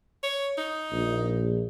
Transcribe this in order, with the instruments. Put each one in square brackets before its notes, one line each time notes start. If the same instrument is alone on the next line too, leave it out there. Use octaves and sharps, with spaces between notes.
[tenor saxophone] C#5
D#4
[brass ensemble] A#1